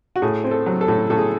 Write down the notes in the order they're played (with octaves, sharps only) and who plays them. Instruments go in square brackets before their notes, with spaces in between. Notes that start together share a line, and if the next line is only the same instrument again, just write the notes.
[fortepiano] F#4
A2 G#4
C4
A4
F#3
A4
A2
A2 A4
G#4